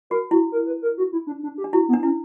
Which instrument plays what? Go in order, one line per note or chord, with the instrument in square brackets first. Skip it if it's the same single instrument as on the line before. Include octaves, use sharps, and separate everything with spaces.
[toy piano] F#4 [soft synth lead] A#4
[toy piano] E4 [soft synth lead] F#4
[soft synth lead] A#4
B4
A#4
F#4
E4
D4
D4
G4
[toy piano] D4
[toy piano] E4 [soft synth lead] F#4
[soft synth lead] B3
[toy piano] D4
[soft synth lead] C#4 [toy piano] E4